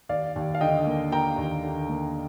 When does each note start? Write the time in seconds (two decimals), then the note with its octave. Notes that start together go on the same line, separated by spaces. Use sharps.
0.09 D#2 D5 F5
0.36 D#2
0.55 F5
0.61 D3 D#5 G5
0.87 A#3
1.11 A#3 G5 A#5
1.37 D#2
1.63 D3
1.89 A#3